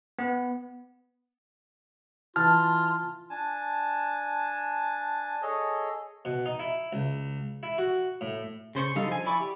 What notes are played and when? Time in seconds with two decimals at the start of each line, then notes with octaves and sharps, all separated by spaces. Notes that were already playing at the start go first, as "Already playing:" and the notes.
0.19 B3
2.36 E3 F4 A5 F6
3.30 D4 G#5 A5
5.42 G#4 A4 C#5 D#5
6.25 B2
6.46 D#4
6.60 E4
6.93 C#2
7.63 E4
7.78 F#4
8.21 A2
8.75 C#3 C5 C#5 C#6
8.95 D3 G3 D#4 A4 F5
9.08 F3 G#5
9.26 E4 D5 B5 C#6 D6
9.41 G4